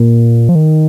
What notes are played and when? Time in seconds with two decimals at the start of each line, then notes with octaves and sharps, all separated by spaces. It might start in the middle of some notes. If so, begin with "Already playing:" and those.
Already playing: A#2
0.49 F3
0.55 D#3